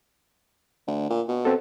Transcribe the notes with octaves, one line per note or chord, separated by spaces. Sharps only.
D2
A#2
B2
C4 A4